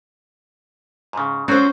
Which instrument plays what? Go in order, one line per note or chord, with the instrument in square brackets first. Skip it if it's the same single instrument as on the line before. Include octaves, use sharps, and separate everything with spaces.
[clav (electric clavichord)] G#2 C#3
[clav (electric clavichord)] F#3 C4 F#4 [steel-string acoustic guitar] C#4 C5